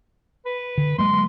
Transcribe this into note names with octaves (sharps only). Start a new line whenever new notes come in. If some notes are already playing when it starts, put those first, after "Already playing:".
B4
D3
F#3 G#3 A#3 C6